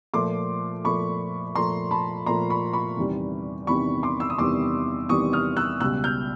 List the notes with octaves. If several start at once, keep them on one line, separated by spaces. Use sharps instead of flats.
A#2 F3 A3 C6 D6
A#2 F3 A3 B5 C#6
A#2 F3 A3 A#5 C6
A5 B5
A#2 F3 A3 A#5 C6
B5 C#6
B5 C#6
E2 C3 D#3 G3 B3
E2 C3 D#3 G3 B3 B5 C#6
C6 D6
E6
D#6
E2 C3 D#3 G3 B3 C6 D6
E2 C3 D#3 G3 B3 C#6 D#6
D#6 F6
E6 F#6
C#2 B2 G3 E6 F#6
F6 G6